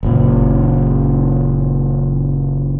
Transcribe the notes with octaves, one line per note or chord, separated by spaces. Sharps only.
F#1 A#2